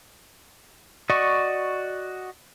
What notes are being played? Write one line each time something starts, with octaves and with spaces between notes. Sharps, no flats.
F#4 D5 D#5 C#6